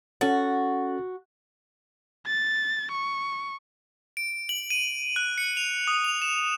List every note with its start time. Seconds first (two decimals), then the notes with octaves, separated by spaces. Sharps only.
0.21 C#4 F#4 A4 A6
2.27 A6
2.92 C#6
4.17 D7
4.49 F#7
4.70 D#7
5.16 F#6
5.38 C#7
5.57 F7
5.87 D#6
6.04 F7
6.22 E7